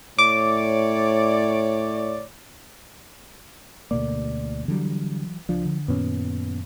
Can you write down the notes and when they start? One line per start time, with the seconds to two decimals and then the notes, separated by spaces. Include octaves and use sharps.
0.19 A2 C#5 D5 D6
3.91 D2 B2 A#3 D5
4.68 D3 E3 F#3 G3
5.49 C#2 F3 D4 F4
5.65 D3
5.88 F#2 A#2 D#3 B3 C#4